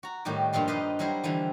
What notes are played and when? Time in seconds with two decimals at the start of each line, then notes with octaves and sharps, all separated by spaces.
0.03 F#4 A#5
0.25 A2 D#3 G3 F#4 G4 G5
0.53 G2 A#2 F3 F4 C6
0.68 D#4 F4 G4 B4 C5 D#5
0.99 F#3 G3 E4 A#4 C5
1.24 D3 E3 F3 G3